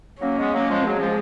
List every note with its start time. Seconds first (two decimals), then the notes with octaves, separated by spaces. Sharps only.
0.19 F#3 A#3 C#4
0.37 G#3 B3
0.52 F#3 A#3
0.69 F3 G#3
0.86 F#3 G#3
0.99 F3